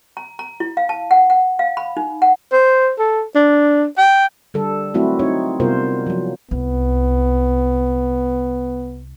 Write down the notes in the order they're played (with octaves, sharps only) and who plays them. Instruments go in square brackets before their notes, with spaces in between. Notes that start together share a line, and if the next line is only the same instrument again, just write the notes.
[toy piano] A#5
A#5
E4
F5
A5
F#5
F#5
F5
B5
D#4
F#5
[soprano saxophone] C5
A4
D4
G5
[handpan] D3 G3 A4
F#3 A3 C4 E4 F#4
C4 D#4 C#5
C3 G3 B3 F4 A#4 C5
F3 F#3
[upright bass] C2 [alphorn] B3